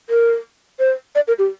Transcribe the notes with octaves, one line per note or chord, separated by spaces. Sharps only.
A#4
C5
D5
A#4
G4